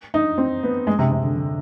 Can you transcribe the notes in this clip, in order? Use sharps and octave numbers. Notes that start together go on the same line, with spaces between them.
D#4
C4
B3
G#3
C3
C3
D3
D3